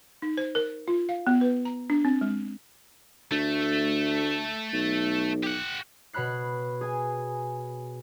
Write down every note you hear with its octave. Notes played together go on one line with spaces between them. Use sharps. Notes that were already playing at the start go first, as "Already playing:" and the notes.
D#4
C5
A#4
F4
F5
B3
B4
A#5
D4
C4
G#3
D2 A3
B1
G4 F#5
B2 C#5 B5 F#6 C7
G#4 G#5